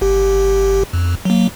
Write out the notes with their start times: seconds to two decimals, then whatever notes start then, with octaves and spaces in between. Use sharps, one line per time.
0.01 G1 G4
0.93 F2
1.25 F#3 A#3